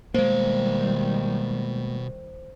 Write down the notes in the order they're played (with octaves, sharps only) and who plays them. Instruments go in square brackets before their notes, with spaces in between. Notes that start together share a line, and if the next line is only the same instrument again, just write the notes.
[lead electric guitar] B2 F5 [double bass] D#3 G3 [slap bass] G#3 A#3 [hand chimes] C5